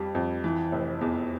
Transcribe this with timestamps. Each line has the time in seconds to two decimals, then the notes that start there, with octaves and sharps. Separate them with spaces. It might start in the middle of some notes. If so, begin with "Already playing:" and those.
Already playing: F2 G3
0.15 F2
0.44 E3
0.72 F1
1.01 E2